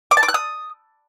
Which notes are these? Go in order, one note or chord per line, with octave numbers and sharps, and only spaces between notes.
D6
A5
D6
F#6
D#6